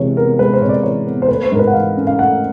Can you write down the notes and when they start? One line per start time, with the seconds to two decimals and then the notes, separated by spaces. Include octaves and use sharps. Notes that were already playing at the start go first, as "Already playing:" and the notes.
Already playing: C3 E3 G#3 C#5
0.17 B3 A#4
0.39 G#3 B4
0.53 C5
0.62 C3 C#5
0.69 D5
0.83 E3 C#5
1.06 B3
1.22 C5
1.29 A3 B4
1.44 C5
1.52 G#2 A#4
1.59 B4
1.67 F#5
1.73 E3 F5
1.97 C#4
2.07 F5
2.18 A3 F#5